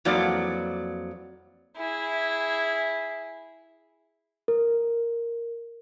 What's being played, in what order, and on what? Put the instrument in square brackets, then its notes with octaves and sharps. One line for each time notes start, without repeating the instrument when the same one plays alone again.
[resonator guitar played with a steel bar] F2 E3 F#3 A#3 D5
[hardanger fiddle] E4 G#4
[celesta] A#4